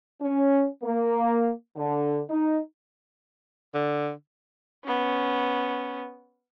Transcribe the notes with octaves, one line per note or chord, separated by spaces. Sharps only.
C#4
A#3
D3
D#4
D3
B3 C#4